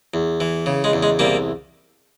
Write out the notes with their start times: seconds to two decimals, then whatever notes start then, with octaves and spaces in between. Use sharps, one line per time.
0.14 E2
0.40 E3
0.66 C#3
0.84 G#3
0.93 E2
1.03 G#3
1.19 C2 G3 A#3